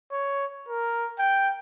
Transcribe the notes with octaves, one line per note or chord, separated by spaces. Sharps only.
C#5
A#4
G5